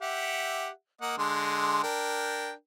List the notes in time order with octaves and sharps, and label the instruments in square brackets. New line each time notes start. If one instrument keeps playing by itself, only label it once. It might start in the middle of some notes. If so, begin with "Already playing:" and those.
[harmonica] G4 E5 F#5
A#3 D#5 F#5
D3 G#3 C6
D4 A#4 G5